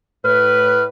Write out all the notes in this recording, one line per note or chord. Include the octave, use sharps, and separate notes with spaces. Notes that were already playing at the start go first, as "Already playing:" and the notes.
A2 B4 F6